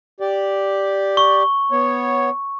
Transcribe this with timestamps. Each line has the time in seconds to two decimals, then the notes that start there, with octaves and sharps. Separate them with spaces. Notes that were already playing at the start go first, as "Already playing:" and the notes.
0.20 G4 D5
1.17 C#6
1.72 B3 C#5